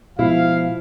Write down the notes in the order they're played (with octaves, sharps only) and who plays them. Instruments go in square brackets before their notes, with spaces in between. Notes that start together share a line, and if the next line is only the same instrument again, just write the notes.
[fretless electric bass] B2 G#3 [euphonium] F3 [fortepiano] E4 [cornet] F5